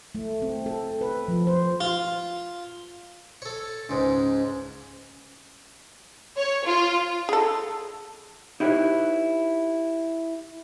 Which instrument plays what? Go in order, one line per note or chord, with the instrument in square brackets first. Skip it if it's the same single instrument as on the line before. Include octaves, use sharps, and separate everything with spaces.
[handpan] A3
C4
A4
B4
F3
C5
[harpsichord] F4
A4 C#5
[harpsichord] C#2 G#2 [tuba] C#4
[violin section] C#5
F4
[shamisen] G#4 A4
[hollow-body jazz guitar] D#4 E4 G4 A4 B4 C#5